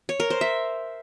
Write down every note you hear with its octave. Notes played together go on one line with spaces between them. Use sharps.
C#5
A#4
C5
E5